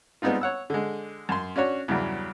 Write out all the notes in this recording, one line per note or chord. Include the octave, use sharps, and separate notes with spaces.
G3 G#3 B3 C4 D#4 F4
C#5 F#5 E6
D3 G#3
F#2 C6
C#4 D4 F#4 C#5
E2 G2 C#3 F#3 G3